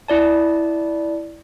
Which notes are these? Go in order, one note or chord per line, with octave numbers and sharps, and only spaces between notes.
E4 D5 A5